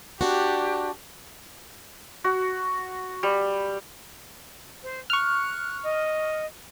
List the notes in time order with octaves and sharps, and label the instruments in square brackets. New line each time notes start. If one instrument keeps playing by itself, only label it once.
[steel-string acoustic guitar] D4 F#4 [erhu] G4
[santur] F#4
G3
[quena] C5
[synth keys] C#6 F6 [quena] F#6
[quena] D#5